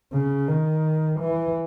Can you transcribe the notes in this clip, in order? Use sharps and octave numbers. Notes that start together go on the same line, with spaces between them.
C#3
D#3
E3